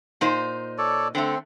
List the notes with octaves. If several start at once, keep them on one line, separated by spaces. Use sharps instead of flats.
A#2 D#4 C5
A4 C#5 D5
D3 A3 C4